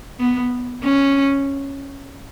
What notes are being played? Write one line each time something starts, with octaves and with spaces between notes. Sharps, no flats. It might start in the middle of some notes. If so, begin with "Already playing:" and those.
B3
C#4